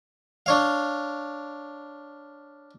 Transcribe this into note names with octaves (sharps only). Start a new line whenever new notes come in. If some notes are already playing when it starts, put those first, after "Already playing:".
D4 C#5 F5